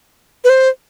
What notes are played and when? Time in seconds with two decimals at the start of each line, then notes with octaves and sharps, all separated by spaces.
0.44 B4
0.49 C5